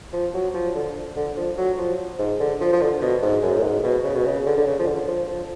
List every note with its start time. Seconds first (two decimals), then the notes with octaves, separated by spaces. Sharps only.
0.13 F3
0.34 F#3
0.54 F3
0.75 D3
1.16 D3
1.37 F3
1.58 F#3
1.78 F3
2.19 G#2
2.40 D3
2.61 F3
2.72 F3
2.81 D3
3.02 B2
3.23 G#2
3.43 F#2
3.55 A2
3.63 G#2
3.84 B2
4.04 C#3
4.15 B2
4.25 C#3
4.46 D3
4.57 D3
4.67 C#3
4.79 F3
4.87 D3
5.08 F3
5.28 F3